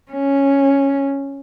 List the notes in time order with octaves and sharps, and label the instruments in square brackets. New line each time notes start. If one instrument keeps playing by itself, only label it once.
[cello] C#4